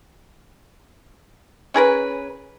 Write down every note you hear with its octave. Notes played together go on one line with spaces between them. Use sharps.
C#4 G#4 A#4 B4